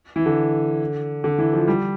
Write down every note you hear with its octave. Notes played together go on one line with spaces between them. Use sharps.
E3
D3
D3
E3
F3
G3